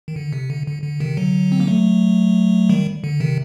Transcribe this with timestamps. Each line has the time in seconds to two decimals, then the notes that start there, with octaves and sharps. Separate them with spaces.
0.08 D#3
0.16 D3
0.33 C3
0.50 D3
0.67 D3
0.84 D3
1.00 C3 D#3
1.17 D3 F#3
1.52 C4
1.60 A#3
1.67 F#3 A3
2.69 D#3 G3
3.04 D3
3.20 C3 D#3